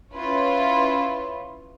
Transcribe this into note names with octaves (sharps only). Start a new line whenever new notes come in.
C#4 E4 F4 B4 C#5